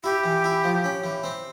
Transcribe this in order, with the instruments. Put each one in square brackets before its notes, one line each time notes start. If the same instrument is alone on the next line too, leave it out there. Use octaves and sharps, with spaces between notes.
[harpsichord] E4 [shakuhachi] G4
[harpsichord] E3
E4
F3
C#4
E3
C4